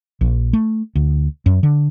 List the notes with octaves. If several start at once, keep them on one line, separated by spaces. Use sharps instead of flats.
A#1
A3
D2
F#2
D3